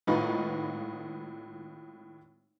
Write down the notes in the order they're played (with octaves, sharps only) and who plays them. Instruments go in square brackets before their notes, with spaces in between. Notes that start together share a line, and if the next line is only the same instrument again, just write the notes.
[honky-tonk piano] G#1 A2 D#4 F4 B4